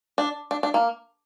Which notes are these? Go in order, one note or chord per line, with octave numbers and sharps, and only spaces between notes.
D4
D4
D4
A#3